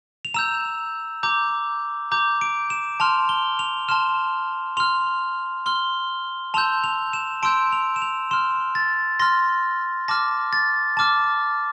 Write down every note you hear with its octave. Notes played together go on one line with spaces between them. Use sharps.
F7
A#5 E6 G6 E7
A#5 D6 G6
A#5 D6 G6
D7
E7
A5 C6 F6 F7
G7
F7
A5 C6 F6 E7
C6 F6 F7
C6 F6 G7
A5 C6 E6 G6 F7
F7
E7
A5 C6 E6 G6 D7
F7
E7
F7
C6 F6 E7
A6
C6 F6 A#6
A5 D6 F6 A#6
A6
A5 D6 F6